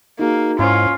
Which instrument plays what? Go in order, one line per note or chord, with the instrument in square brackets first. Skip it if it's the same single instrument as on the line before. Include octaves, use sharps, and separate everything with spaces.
[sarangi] A#3 [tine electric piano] D#4 F#4 G#4
[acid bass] G#2 [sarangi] C#4 [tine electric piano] E4 C5 [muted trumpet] F4